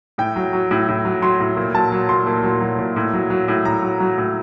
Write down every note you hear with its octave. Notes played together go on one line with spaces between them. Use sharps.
A2 G5
F#3
F#3
A2
A2
F#3
F#3 C6
A2
A#2
F#3 A5
F#3
A#2 C6
A#2
F#3
F#3
A#2
A2
F#3
F#3
A2
A2 A#5
F#3
F#3
A2